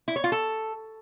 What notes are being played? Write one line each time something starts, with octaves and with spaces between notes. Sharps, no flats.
E4
C#5
F4
A4